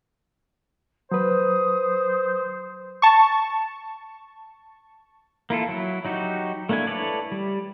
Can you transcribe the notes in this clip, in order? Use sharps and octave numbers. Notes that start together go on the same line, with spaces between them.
F#3 B4 C5 D#6
A5 C#6
A#3 E4 F4 A4
F#3 E4
F#3 D#4 F#4 G4
A3 A#3 D4 E4 G#5
E4 A4 B4 C#5 D5
G3